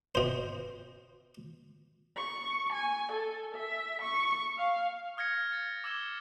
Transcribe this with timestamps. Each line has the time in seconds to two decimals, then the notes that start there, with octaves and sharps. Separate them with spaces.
0.15 B2 C5
2.17 C#6
2.73 G#5
3.13 A4
3.56 E5
4.02 C#6
4.58 F5
5.17 D#6 F6 G#6 A#6 C#7
5.53 A6
5.84 D6 E6 G#6 E7 G7